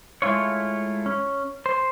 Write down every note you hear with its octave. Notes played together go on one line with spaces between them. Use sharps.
G#3 A3 E4 F4 C#5
C#4
C5